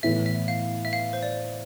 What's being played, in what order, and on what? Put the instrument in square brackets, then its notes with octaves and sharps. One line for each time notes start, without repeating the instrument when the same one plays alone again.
[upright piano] A2 E3 B3 E4 [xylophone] E5
[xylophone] E5
F5
E5
F5
C5
D5